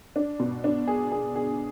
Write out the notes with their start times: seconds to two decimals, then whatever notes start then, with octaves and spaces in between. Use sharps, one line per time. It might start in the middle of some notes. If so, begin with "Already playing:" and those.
0.16 D4
0.40 B2
0.64 D4
0.88 G#4
1.12 G#4
1.36 G#4